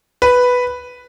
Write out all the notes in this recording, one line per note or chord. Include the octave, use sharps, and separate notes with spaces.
B4